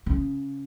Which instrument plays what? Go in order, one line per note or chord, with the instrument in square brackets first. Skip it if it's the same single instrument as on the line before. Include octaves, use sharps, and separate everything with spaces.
[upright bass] C#3